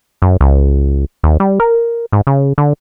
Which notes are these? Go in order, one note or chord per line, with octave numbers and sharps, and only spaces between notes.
F#2
C#2
D#2
G3
A#4
G#2
C#3
D3